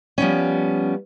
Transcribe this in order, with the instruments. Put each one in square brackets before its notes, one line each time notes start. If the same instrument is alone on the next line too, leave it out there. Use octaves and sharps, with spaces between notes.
[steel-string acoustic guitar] F3 G3 B3 C#4